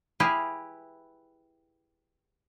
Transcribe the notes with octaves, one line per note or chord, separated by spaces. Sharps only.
E4 G4 G#4 B4 E5 F5